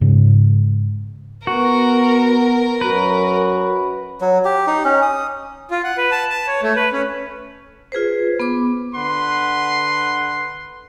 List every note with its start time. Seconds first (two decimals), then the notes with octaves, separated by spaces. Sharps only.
0.01 G#2 C#3
1.47 B3 F#4 A#4
2.81 F#2 F#4 B4
4.21 F#3
4.45 G4
4.67 D#4
4.85 C#4
5.02 D#6
5.71 F4
5.84 F#5
5.98 B4
6.12 A5
6.30 A5
6.47 C#5
6.63 A3
6.76 B4
6.93 C#4
7.92 F4 G#4 B4 C5
8.40 B3 B5 D6
8.95 D3 B4 F#5 C6